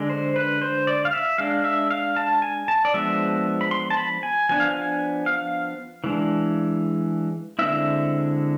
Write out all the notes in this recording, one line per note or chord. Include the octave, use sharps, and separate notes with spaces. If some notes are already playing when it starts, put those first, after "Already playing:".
Already playing: D3 G#3 D4
C5
B4
C5
D5
F5
E5
G#3 D4 F5
E5
F5
A5
G#5
A5
D5
F3 G#3 B3 D4 E5
B5
C6
A5
B5
G#5
F3 B3 D4 G#5
F5
G#5
F5
E3 G#3 D4
D3 G#3 C4 E4 E5